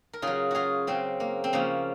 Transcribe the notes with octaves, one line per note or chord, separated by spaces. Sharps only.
A#4
C#3 F#3 F4 G#4
F4 F#4 G#4
C#3 F#3 C4
A#3
C4
C#3 F3 A#3 C#4